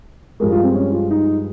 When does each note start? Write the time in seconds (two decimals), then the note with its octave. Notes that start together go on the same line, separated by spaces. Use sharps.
0.40 G2 F3 G#3 A#4
0.52 F4
0.63 C4
0.75 C#4
0.92 F4
1.10 D#4